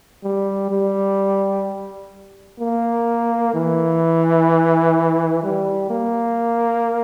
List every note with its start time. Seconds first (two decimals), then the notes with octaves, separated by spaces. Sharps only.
0.24 G3
0.71 G3
2.60 A#3
3.54 E3
5.44 G3
5.90 A#3